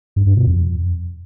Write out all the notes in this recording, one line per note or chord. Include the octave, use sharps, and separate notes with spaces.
G2
G2
B2
F2